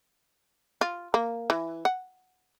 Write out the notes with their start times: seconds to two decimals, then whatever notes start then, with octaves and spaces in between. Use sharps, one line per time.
0.81 F4
1.14 A#3
1.50 E3
1.85 F#5